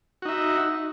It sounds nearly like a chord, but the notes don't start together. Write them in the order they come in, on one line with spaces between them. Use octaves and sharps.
F#4 D#4 E5